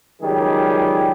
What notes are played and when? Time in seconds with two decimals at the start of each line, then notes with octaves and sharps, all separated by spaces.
0.21 C#2 D#3 F#3 G3 G4 G#4